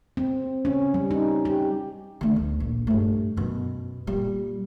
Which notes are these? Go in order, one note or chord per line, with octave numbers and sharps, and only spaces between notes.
C4
C#4
G3
D#4
G4
D3 A3
D2
A#1
G2 A3
F#2 B2
A#2 G3